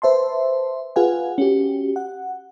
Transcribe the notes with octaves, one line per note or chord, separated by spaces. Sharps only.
B4 C5 E5 A5 C6
F4 G#4 B4 F5 F#5 G#5
C#4 F#4 G4
F#5